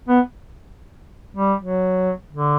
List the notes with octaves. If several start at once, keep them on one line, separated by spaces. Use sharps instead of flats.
B3
G3
F#3
D3